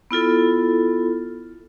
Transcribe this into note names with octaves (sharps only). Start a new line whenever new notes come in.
B3 E4 F4 A4